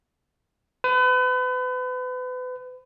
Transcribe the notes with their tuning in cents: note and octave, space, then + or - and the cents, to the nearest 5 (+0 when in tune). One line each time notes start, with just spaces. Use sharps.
B4 +35